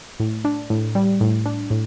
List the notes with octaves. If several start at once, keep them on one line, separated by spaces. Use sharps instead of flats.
A2
D4
A2
G3
A2
D4
A2